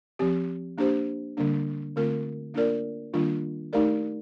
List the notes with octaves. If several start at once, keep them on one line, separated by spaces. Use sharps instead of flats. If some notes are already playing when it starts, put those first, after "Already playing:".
F3 C4 G4
A#3 D4 G4 C5
D3 G3 A#3 D4
D3 A3 C4 F4 A#4
A#3 D4 F4 A#4 D5
D#3 G3 A#3 D4 F4
A3 D#4 G4 A#4 D5